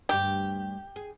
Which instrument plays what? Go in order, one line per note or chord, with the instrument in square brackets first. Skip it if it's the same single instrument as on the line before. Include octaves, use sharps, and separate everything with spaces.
[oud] D2 G2 G3 [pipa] G4
[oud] G#4